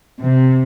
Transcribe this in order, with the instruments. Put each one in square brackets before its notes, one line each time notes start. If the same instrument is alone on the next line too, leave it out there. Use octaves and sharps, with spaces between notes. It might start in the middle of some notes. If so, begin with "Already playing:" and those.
[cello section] C3